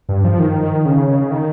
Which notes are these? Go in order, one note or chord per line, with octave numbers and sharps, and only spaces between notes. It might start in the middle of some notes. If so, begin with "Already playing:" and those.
G2
F3
D#3
C#3
C#3
D#3